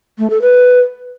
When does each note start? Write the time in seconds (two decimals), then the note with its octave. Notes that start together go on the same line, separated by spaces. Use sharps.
0.18 A3
0.30 A4
0.42 B4